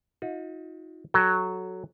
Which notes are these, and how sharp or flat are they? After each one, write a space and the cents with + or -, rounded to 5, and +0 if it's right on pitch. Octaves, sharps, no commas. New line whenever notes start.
D#4 +30 F#4 -45
F#3 +0 A4 -10 G5 +0